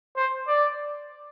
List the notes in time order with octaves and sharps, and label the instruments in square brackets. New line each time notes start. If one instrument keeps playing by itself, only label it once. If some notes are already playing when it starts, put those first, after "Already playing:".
[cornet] C5
D5